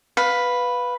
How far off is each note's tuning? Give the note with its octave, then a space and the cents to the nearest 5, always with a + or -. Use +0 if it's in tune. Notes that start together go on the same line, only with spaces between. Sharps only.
B4 +0 F5 +15